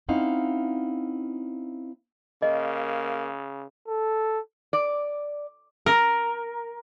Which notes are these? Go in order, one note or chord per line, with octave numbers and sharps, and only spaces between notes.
C4 C#4 D#4 E4 F5 F#5
C#3 A#3 D#5
A4
D5
A#4